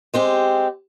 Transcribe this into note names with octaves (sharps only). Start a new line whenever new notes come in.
G#3 C4 G4